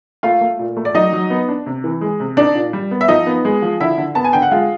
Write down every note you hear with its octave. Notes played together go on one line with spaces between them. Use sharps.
A3 F4 F5
A3
A#2
A3
D5
F#3 D#4 D#5
F#3
B3
D4
C3
E3
G#3
C3
D4 D#4 D5
A#2
G3
B3
E5
F3 D#4 D#5
B3
G#3
F3
D3 E4 E5
D3
B3 A5
G#5
D3 G5
F#5
G#3 F4 F5